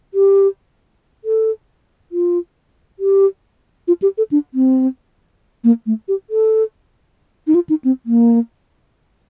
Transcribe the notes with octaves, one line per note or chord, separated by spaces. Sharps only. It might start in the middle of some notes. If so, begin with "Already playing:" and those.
G4
A4
F4
G4
F4
G4
A4
D4
C4
A#3
A3
G4
A4
D#4
F4
D#4
C4
A#3